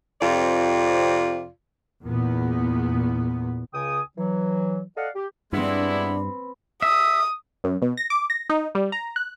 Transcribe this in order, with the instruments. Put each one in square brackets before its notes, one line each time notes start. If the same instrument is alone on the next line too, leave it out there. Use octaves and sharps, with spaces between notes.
[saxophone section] F2 C3 F4 D5
[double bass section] E2 A#2 B3
[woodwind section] C#2 C#3 G5 G#5 D#6
E3 F#3
A4 D5 D#5 F5 F#5
G4
[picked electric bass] G2 [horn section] G#3 B3 E4 [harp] C4 B4 [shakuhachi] D4
[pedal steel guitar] E5 [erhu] D#6
[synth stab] F#2
B2
A#6
D6
A#6
D#4
G3
A#5
F#6